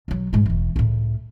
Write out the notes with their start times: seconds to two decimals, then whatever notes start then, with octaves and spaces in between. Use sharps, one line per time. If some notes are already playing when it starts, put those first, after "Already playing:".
0.08 B1 F#3
0.33 G#2 G#3
0.46 E1 E3
0.76 C#2 A2